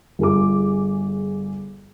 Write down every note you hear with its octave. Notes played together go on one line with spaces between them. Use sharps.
G1 G#4 D6